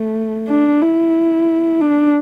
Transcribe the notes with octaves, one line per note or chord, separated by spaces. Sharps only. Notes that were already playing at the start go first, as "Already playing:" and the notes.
Already playing: A3
D4
E4
D4